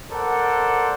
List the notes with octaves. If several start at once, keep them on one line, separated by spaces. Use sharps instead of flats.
A4 A#4 C5 D5 F#5